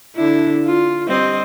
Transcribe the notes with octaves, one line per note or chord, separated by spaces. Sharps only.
D3 D4 E4
F4
G3 C4 D#5